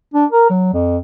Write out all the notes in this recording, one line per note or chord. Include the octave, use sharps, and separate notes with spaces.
D4
A#4
F#3
F2